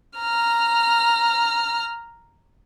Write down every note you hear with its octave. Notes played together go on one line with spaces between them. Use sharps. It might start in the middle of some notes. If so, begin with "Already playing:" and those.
A#5 F6